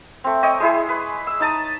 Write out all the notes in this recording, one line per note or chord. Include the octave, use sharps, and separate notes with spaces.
A3 C4
C#5 D#5 G5 D#6
G#3 E4 G#4
B4
E6
D#4 A5 D#6